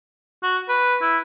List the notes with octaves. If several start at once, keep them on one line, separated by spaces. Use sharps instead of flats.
F#4
B4
E4